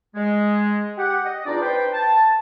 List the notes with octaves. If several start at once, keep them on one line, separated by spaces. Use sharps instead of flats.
G#3
G4 F#5
D#5
E2 D4 D#4 F4 D5
B4 C5 G5
A5